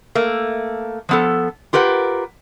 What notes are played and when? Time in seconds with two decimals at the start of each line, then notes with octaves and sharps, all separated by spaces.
0.15 A3 A#3
1.09 F3 B3 A4
1.73 F4 G4 A#4 B4 F#5